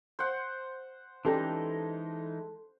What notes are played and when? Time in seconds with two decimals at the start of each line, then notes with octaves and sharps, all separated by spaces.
0.19 C5 F#5
1.25 E3 G#3 C#4 D#4 G4 A4 A5 C6